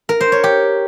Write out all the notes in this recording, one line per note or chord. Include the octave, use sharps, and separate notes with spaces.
A#4
C5
C#5
G4